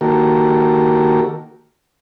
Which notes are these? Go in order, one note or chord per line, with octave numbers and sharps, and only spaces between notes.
D#3 A#3 F#4 G4 A4 A#4